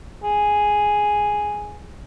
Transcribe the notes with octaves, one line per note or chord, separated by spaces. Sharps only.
G#4